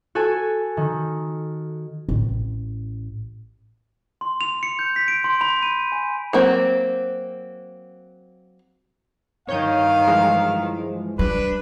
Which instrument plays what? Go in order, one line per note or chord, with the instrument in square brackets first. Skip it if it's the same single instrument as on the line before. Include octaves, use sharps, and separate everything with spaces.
[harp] F#4 A4 G#5
D#3
[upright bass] A1
[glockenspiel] C6
F7
C#7
G6
B6
D7
C6
B5
D#7
G#5
[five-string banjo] F#3 A#3 C4
[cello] G2 D#3 [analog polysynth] C#5 G6 D#7 [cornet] F5
[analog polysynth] E3 F3 G#3
[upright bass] G3 [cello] D4 [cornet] B4